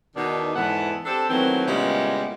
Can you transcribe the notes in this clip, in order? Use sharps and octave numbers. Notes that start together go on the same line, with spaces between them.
E2 B2 D#3 D4 D#4
E2 G#2 E3 B3 A4 F#5
C4 D4 G4 A4
D#3 E3 F#3 A3 B3 C4
A#2 C#3 G3 G#3 B3 E4